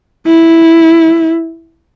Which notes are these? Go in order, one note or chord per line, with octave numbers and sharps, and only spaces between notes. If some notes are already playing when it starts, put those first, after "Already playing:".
E4